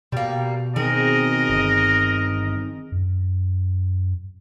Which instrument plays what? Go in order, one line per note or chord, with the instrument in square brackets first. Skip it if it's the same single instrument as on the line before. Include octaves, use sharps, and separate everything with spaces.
[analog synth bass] B2 [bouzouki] G3 A#3
[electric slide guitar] D#3 C4 [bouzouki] G#4 [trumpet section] A#4 D#5
[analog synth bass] G1
[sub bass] F#2